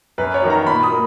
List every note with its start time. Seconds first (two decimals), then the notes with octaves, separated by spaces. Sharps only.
0.18 F#2 B4
0.34 C#5
0.42 D#3 F#3
0.50 A#5
0.66 A#2 B5
0.83 D#6
0.91 A#3